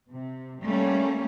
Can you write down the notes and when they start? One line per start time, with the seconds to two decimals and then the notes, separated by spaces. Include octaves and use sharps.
0.12 C3
0.63 G3 A3 A#3 C#4